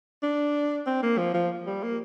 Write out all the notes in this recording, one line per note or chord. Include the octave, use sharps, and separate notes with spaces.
D4
C4
A#3
F3
F3
G3
A#3